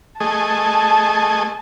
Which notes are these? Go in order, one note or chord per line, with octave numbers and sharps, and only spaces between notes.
A3 G#4 D#5 A5